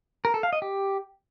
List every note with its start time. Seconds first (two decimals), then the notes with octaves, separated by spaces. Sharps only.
0.25 A#4
0.34 A4
0.43 F5
0.53 D#5
0.62 G4